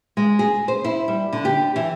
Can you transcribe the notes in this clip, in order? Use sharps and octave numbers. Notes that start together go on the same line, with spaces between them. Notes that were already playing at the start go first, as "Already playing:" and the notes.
G#3
G#4
C5
E4
G3
D3
G4
E3